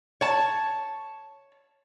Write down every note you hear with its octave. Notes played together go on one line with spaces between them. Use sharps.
C#5 A5